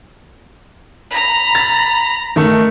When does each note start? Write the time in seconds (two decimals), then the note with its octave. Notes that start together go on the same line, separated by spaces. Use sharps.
1.13 A#5 B5
1.55 A6
2.36 D#3 A3